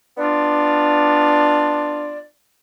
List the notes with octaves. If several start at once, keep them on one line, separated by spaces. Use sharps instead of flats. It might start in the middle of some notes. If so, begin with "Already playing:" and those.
B3 D4 F4 D5